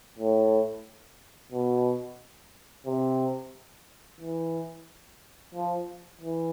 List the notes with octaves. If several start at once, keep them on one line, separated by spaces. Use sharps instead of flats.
A2
B2
C3
E3
F3
E3